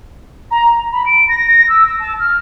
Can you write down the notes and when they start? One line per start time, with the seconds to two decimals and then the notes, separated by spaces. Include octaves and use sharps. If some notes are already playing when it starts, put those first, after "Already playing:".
0.51 A#5
0.92 B5
1.06 D7
1.28 A#6
1.47 A#6
1.68 E6
1.86 E6
2.00 A5
2.20 F6